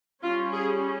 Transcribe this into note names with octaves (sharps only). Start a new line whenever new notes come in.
G3 C#4 F4
G#4